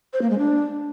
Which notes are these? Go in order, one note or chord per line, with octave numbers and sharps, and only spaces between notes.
C5
A#3
G#3
D4